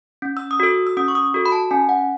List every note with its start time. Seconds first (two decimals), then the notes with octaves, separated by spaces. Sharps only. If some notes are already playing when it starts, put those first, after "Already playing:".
0.22 C#4
0.37 E6
0.51 D#6
0.60 F#4 A4 E6
0.87 E6
0.97 C#4 D#6
1.08 C#6
1.15 D#6
1.34 F#4 A4
1.46 B5
1.52 A5
1.71 C#4 G#5
1.89 F#5